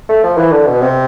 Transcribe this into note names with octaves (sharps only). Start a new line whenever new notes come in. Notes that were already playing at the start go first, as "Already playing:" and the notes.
A3
F3
E3
D3
B2
C3